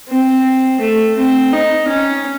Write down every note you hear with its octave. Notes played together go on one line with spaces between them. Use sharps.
C4
A3
C4
D#4
C#4